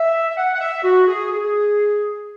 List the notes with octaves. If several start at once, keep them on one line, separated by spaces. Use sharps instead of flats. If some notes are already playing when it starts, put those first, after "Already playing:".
Already playing: E5
E5
F#5
F#5
E5
F#4
G#4
G#4